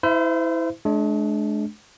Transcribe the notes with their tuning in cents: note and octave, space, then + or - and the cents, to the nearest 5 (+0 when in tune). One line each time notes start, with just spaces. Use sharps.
E4 -15 C5 -35 E5 +35
G#3 +40 D4 +0